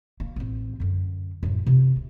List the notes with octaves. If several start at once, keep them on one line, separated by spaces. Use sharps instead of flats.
A#3
A1 C4
F#2 D3
F#2 A2
C3 F4
D2